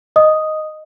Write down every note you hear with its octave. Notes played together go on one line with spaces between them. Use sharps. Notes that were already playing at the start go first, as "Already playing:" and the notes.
D#5 D#6